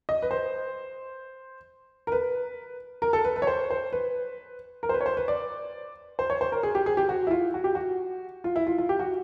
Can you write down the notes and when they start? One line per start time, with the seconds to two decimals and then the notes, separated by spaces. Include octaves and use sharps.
0.09 D#5
0.22 B4
0.31 C5
2.07 A#4
2.12 B4
3.02 A#4
3.13 A4
3.25 B4
3.36 B4
3.42 C#5
3.47 C5
3.70 C5
3.93 B4
4.83 A#4
4.89 C5
4.94 B4
5.01 C#5
5.06 C5
5.17 B4
5.28 D5
6.19 C5
6.30 C#5
6.41 C5
6.52 A#4
6.63 G#4
6.75 G4
6.86 G#4
6.97 G4
7.09 F#4
7.27 E4
7.31 F4
7.54 F#4
7.64 G4
7.75 F#4
8.44 F4
8.56 E4
8.67 F4
8.78 F4
8.89 G4
9.00 F#4